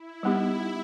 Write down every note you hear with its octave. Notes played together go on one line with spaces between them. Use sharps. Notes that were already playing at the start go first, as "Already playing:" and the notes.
Already playing: E4
G3 B3 D#4 G4